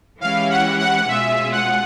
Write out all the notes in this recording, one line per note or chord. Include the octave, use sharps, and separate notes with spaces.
E3 G#3 C#4 E4 G4 F5
F#5
F#5
B2 G#3 C#4 F4 G#4 E5
F#5